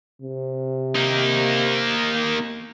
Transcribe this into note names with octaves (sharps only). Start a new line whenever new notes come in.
C3
A#3 D#4